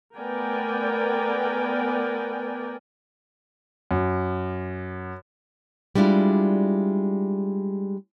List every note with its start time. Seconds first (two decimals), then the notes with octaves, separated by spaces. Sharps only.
0.17 A3 B3 A#4 D5 G5 G#5
3.91 F#2
5.95 G3 G#3 D4 E4 F4